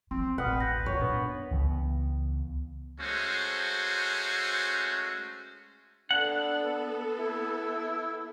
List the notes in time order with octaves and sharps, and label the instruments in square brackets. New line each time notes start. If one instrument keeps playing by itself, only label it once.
[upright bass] F3 B3 [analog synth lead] C4 [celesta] C6
[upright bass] D1 A1 [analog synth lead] B4 [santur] F#5 [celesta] G5 D#6 F6
[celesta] F#6 G6 A#6
[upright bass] F#2 A#2 [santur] C#5
[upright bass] F#2 [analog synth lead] B3 [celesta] D4
[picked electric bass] C#2 E3 G#3 B3
[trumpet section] G#3 A3 C#4 F#4 C5
[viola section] B3 A4 [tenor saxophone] D4 [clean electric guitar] F#5
[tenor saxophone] E4